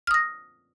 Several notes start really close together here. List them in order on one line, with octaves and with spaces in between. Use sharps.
F6 D#6 A#6